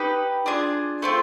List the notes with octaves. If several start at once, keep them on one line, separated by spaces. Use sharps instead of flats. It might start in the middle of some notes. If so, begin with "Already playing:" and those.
Already playing: D#4 G4 B4
D4 F4 G#4
A3 C4 F4